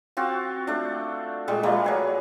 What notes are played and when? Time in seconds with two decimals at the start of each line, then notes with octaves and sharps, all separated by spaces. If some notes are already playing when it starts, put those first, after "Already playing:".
0.17 C4 F4 F#4
0.67 A3 D4
1.48 A#2 G3 G#3
1.63 F3 G3 A3 A#3
1.84 F#3 G#4 B4